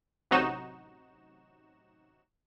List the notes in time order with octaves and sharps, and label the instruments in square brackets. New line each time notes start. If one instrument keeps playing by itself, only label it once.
[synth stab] A1 C3 F#3 D#4 F#4 E7